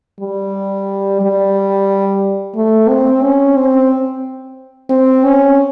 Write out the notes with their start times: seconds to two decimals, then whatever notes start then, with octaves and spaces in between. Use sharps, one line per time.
0.20 G3
1.21 G3
2.55 A3
2.89 C4
3.23 C#4
3.56 C4
4.90 C4
5.24 C#4